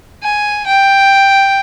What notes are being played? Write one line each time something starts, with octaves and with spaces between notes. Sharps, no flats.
G#5
G5